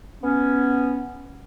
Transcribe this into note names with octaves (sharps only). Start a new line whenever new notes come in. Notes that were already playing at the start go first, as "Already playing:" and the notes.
B3 C#4